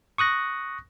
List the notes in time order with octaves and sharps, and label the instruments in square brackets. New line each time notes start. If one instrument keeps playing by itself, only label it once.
[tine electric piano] C#6 D#6 F#6 A#6